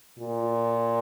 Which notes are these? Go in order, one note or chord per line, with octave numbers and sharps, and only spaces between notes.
A#2